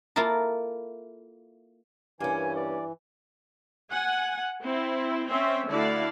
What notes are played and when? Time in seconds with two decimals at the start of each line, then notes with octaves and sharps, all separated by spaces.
0.16 A#3 E4 F4 A4 A#4
2.20 G2 E3 A#3 C#4 G#5
2.56 D5
3.90 F#5 G#5
4.63 C4 E4
5.29 C4 C#4 E5
5.67 D3 A3 E4 F#4 D5 F5